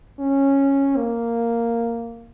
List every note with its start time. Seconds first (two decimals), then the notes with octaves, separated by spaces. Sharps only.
0.20 C#4
0.97 A#3